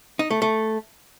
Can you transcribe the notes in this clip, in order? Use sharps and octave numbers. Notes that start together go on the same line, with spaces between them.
D#4
A3
A3